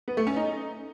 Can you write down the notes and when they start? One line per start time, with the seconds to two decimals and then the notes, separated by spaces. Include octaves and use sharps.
0.08 B3
0.17 A3
0.27 C#4
0.36 D#4